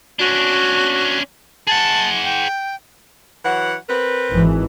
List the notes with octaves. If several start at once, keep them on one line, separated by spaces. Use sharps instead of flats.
C#4 D4 F#4
G#4 F#5 A5
G5
E3 F#3 F#5
C4 A#4 B4
G#1 E3